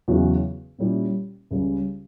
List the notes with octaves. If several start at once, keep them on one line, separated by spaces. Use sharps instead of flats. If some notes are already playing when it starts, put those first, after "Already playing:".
E2 C#3 F#3 C#4 F#4
A#2 G3 C#4 E4
C#2 C#3 G3 C#4